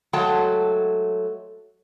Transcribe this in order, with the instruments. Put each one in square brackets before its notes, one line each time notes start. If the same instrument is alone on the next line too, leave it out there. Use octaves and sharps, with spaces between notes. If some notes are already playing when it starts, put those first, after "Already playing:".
[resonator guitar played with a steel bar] F#3 G#3 A3 C#5 G5 A5